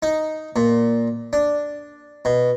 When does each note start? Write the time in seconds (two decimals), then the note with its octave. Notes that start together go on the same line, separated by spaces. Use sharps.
0.03 D#4
0.56 A#2
1.33 D4
2.25 B2